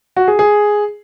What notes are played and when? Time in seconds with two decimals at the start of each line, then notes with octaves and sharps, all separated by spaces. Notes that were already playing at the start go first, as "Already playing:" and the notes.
0.17 F#4
0.28 G#4
0.39 G#4